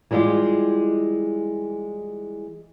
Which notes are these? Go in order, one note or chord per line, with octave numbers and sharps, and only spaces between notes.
E3 G3 G#3 F4 G4